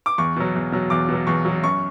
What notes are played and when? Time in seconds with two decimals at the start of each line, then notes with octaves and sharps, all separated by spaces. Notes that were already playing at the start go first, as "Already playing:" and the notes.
0.06 D6
0.18 E2 C#6
0.36 B2 F#3
0.55 E2
0.72 B2 F#3
0.90 E2 D6
1.08 B2
1.14 F#3
1.27 E2 C#6
1.45 B2 F#3
1.63 F#2 C#6